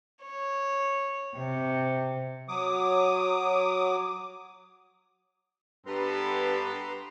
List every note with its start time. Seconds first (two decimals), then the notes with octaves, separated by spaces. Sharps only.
0.24 C#5
1.36 C3
2.49 F#3 D6 D#6
5.86 G2 B3 G4 A4 B4 A#5 C6